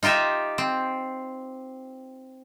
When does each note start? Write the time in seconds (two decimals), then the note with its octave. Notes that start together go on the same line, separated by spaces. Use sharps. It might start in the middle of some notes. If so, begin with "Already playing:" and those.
0.03 D#4 F4 G4 D#5 E5
0.58 C4